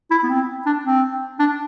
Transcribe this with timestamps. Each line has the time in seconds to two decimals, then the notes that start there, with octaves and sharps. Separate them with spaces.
0.11 E4
0.24 B3
0.30 C4
0.66 D4
0.85 C4
1.39 D4